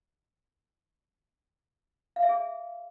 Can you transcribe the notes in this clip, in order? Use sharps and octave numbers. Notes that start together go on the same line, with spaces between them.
F5
E5
G#4